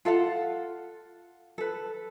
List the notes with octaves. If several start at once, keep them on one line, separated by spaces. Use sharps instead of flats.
F4 A4 F5 F#5
A4 B4